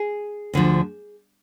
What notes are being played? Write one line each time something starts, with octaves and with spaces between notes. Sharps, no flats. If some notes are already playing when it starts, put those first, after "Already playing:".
Already playing: G#4
D2 D3 F3